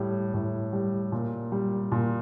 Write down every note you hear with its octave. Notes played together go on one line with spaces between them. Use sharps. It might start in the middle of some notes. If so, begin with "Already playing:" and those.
Already playing: A2 G3
A2
G3
A#2
G3
A#2